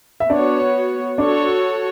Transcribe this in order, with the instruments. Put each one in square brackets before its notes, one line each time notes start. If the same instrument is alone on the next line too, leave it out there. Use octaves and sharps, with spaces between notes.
[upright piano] E5
[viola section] B3 F#4 C#5 [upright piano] D4 D5
[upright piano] D4 D5 [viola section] F#4 A4 C#5